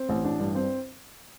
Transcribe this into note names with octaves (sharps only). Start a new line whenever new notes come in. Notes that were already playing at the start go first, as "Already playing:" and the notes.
Already playing: C4
A1
A1 D4
G2
C4